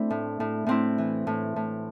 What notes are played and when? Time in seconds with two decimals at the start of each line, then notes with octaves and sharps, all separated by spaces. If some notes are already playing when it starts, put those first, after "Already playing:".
Already playing: A3 C4 D4 E4
0.10 A2
0.40 A2
0.66 A2 C4 E4
0.98 E3
1.27 A2
1.56 A2